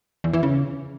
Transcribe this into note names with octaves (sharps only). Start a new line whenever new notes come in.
E2
E3
C#3